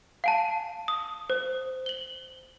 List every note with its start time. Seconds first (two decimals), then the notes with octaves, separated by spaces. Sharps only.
0.24 F5 G#5 A5
0.88 D#6
1.30 C5
1.86 F#7 G7